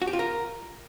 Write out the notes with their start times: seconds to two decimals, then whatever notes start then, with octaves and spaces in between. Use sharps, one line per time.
0.02 F#4
0.07 G4
0.13 F4
0.19 A#4